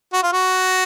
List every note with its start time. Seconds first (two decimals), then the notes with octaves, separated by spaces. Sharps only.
0.13 F#4
0.23 F4
0.33 F#4